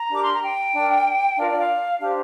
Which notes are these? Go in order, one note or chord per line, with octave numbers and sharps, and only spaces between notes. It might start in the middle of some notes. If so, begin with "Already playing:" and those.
Already playing: A#5
D4 G4 A#4 D6
C6
A#5
G5
D4 A#4
D4 F4 A#4 F5
D5
F5
D4 G4 C5 F5